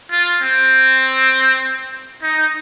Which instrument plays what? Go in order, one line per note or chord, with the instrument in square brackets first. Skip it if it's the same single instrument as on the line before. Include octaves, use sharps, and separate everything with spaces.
[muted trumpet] F4
C4
D#4